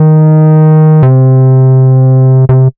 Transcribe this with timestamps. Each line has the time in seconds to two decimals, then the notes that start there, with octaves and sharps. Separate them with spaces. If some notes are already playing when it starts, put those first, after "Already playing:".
Already playing: D#3
1.03 C3
2.49 C3